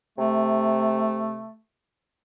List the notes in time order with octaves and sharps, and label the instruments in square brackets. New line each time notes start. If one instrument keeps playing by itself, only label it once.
[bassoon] C3 [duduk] A3